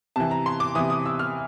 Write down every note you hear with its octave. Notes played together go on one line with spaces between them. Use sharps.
C3 E3 A5
A#5
C6
D6
C3 E3 D#6
D#6
E6
F6